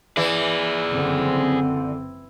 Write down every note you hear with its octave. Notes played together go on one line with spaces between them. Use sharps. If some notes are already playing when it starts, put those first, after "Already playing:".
E3 G#4 D5
F#1 D3 C4